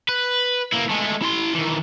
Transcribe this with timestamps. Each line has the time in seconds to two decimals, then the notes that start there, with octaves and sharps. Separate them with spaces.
0.09 B4
0.72 A#3 E4
0.89 G#3 A3
1.22 E4 C6
1.55 D#3 E3